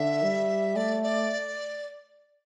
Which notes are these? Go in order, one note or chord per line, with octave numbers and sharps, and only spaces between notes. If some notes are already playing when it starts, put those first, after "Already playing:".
Already playing: D3 E5
G3
A3 D5
D5